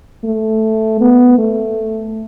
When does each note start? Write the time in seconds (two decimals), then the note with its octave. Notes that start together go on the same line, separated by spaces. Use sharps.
0.24 A3
1.01 B3
1.38 A3